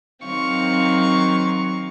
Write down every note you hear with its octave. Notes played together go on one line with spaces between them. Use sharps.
D#3 F#3 C4 F5 C#6